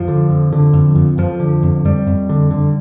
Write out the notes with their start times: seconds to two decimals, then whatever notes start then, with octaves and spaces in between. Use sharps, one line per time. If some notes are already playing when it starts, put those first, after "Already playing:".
Already playing: F2 F3
0.08 D3
0.30 F2
0.52 D3
0.73 F2
0.96 F2
1.18 F2 F3
1.40 D3
1.63 F2
1.85 F2 G3
2.07 F2
2.29 D3
2.51 D3